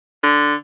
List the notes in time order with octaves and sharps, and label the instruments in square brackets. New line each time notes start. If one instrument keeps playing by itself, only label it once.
[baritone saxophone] D3